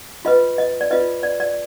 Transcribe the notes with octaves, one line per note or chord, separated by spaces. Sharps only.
F4 B4 D#5
D#5
D5
F4 B4 D#5
D5
D5